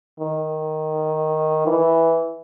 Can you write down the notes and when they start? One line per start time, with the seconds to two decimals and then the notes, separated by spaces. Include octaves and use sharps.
0.20 D#3
1.67 E3